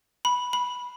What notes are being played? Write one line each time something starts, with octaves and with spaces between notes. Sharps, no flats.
B5
B5